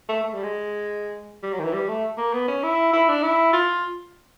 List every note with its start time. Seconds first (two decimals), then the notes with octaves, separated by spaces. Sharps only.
0.09 A3
0.24 A3
0.34 G3
0.44 G#3
1.43 G3
1.53 F#3
1.59 D#3
1.64 E3
1.74 G3
1.89 A3
2.18 A#3
2.33 B3
2.48 C#4
2.64 E4
2.93 E4
3.09 D4
3.23 E4
3.53 F4